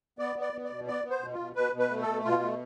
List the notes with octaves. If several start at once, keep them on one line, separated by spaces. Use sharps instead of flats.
B3 D5
B3
D5
B3
D5
B2
B3 D5
B3
C5
B2
F4
B2
B2 B4
B2
B4
A3
A4
B2
B2 F4
A3